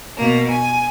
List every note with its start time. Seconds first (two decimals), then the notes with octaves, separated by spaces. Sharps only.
0.17 B2 A#3
0.50 G#5